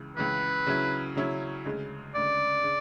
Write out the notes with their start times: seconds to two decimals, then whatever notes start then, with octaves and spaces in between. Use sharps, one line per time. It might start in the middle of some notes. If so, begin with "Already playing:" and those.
Already playing: C#2 C#3 E3
0.17 C#2 C#3 E3 B4
0.67 C#3 F#3 C#4 E4
1.16 C#3 F#3 C#4 E4
1.65 D2 C#3 G#3
2.15 D2 C#3 G#3 D5
2.64 C#3